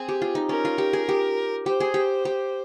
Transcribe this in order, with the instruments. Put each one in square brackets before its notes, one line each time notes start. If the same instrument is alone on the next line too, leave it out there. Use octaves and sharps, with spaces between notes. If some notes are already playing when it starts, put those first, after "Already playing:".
Already playing: [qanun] C4 [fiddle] G#4
[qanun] G4
F4
D#4
[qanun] C#4 [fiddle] A#4
[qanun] F4
G4
G#4
G4
[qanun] G4 [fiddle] C5
[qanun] G#4
G4
G4